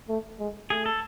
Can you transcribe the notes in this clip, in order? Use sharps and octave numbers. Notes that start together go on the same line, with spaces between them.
A3
G#3
A3 G#4
A4